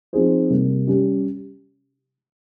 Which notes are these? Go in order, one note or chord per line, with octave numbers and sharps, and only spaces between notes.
F3 C4 D#4 G#4 C5
C3 G3 A#3
G3 C#4 G4